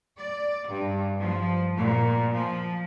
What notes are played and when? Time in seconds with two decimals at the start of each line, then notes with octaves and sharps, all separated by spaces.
0.17 D5
0.68 G2
1.20 F3
1.77 A#2
2.33 F3